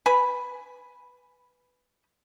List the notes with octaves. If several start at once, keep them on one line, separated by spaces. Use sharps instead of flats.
B4 G#5 B5